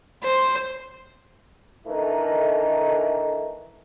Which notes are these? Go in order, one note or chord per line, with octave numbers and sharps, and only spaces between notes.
C5
D3 E3 A3 D#4 A#4